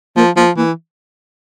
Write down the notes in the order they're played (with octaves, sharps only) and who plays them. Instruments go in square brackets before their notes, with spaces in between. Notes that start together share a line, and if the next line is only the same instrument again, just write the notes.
[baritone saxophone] F3 [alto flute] A#3
[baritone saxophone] F3 [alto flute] A#3
[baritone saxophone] E3 [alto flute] A#3